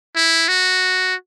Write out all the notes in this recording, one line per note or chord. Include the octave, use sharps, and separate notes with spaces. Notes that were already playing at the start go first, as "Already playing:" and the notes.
E4
F#4